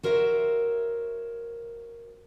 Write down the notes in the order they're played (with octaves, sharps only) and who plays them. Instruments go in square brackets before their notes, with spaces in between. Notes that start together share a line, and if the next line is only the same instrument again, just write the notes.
[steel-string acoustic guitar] F#4 A#4 C5 C#5 E5